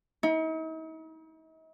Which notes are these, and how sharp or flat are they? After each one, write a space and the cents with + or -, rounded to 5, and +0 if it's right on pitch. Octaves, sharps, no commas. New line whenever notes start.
D#4 +45